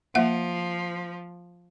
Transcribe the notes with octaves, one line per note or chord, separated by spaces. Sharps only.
F3 A#3 E5 F#5